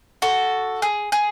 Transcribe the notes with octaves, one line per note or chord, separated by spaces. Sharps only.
F#4 A4
G#4
G#4